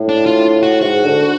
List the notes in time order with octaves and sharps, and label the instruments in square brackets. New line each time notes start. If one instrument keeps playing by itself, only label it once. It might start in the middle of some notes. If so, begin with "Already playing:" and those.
Already playing: [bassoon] A2
[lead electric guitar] D4
F4
F#4
[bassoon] G#2 [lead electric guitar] F#4
[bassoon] D3